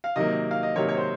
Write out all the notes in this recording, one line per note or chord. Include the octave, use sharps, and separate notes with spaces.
F5
C3 D#3 F#3 A#3 D#5
F5
D#5
C3 D#3 F#3 A#3 C#5
C#5
C5